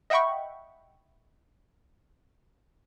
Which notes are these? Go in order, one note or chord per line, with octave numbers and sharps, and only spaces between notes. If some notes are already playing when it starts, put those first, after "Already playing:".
D#5 E5 F#5 G5 B5 C#6